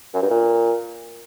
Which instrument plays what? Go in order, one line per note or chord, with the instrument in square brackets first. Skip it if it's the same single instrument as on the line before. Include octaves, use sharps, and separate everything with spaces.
[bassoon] F#2
G2
A#2